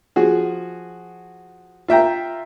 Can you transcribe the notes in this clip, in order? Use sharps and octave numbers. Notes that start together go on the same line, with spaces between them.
F3 F#4 G#4
F4 E5 G5 A#5